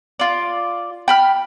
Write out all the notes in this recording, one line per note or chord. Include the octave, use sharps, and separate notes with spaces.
F4 D5
G5 B5 F6